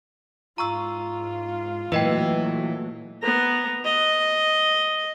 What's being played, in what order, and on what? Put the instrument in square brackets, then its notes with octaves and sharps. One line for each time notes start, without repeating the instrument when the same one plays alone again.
[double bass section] G#2 [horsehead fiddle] F4 [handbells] A#5 C#6 E6
[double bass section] A#2 F#3 A3 [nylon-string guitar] E3 [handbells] B4 D#5 G5
[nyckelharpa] B3 A#5
D#5